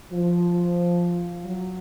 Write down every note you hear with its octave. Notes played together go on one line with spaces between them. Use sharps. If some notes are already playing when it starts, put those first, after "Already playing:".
F3
F#3